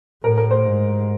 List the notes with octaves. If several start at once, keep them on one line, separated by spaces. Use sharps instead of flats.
A2 A#4
A#4
C5
G#2